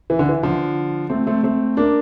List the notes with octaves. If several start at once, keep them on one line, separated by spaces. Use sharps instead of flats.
E3
D3
E3
D3 F3
A3 C4
A3 C4
A3 C4
A#3 D4